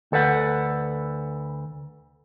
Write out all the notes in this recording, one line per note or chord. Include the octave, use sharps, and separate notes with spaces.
D2 A4 B4 F#5